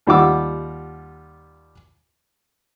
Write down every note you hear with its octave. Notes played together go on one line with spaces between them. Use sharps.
D#2 G3 F4 F#5 D6 E6